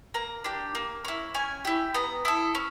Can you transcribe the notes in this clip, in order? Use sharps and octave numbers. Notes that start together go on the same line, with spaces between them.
A#3 A#5
D4 G4
A#3
C#4 E4
C#4 G#5
E4 G4
B3 A#5
E4 A4 D#6
C#4